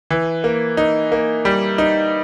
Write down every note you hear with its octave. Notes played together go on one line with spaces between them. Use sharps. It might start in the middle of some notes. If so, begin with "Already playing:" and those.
E3
A#3
D#4
A#3
G3
D#4